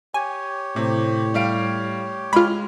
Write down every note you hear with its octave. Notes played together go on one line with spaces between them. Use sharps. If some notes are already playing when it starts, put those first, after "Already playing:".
G4 C#5 G#5
A2 C3
G3 F5 D7
G#3 F4 B5 F6